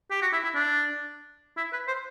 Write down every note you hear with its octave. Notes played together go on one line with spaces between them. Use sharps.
G4
F#4
E4
E4
D4
E4
B4
C5